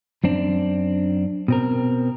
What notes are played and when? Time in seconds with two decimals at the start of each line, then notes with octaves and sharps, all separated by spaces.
0.24 F#2 C4 D4
1.48 B2 C4 A#4